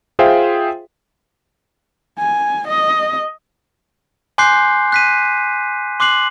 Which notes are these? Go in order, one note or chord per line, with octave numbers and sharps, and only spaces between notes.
F4 G#4 C5 E5 F5 G5
G#5
D#5
G#5 C6 D6 F#6 G6 C7
F#6 B6 D#7
C6 D6 F#6 C7 F#7